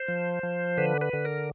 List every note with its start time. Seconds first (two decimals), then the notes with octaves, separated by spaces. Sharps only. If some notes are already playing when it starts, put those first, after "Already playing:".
Already playing: C5
0.08 F3
0.43 F3
0.77 D3 B4
1.01 B4
1.13 D3
1.25 A#4